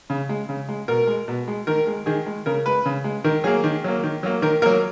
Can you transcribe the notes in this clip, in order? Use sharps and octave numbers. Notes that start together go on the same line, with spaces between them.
C#3
G#3
C#3
G#3
B2 A#4
G#3
B2
G#3
D#3 A#4
G#3
D#3 G#4
G#3
C#3 A#4
G#3 B4
C#3
G#3
D#3 A#4
F#3 A#3 G#4
D#3
F#3 A#3
D#3
F#3 A#3
D#3 A#4
F#3 A#3 A#4